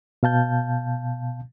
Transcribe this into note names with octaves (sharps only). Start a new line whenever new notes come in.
B2 F5 A5 G6